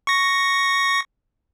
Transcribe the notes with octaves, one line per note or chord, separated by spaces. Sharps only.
C#6 A#6